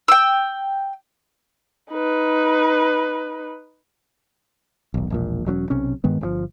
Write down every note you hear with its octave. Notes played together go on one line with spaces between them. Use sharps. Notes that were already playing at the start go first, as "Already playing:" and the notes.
G5 E6
D#4 B4
D#1 B1
E1 A#1 A#2
E1 F#3 C4 C#4
B1 C3 C#4
G2 D#3 G#3 B3
G1 C3 F3